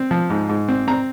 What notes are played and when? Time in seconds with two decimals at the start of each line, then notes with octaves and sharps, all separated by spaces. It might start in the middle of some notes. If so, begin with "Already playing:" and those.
Already playing: C4
0.11 F3
0.30 G#2
0.49 G#2
0.69 C4
0.88 C4 A#5